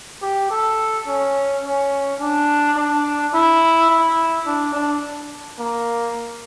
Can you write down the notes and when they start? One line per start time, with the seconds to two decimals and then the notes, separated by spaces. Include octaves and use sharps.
0.22 G4
0.51 A4
1.07 C#4
1.64 C#4
2.20 D4
2.76 D4
3.34 E4
3.90 E4
4.46 D4
4.75 D4
5.59 A#3